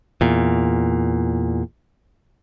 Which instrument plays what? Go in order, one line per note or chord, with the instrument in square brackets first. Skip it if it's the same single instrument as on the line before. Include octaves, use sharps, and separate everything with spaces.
[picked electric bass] E2 A#2